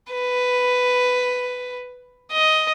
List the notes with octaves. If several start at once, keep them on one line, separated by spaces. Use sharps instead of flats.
B4
D#5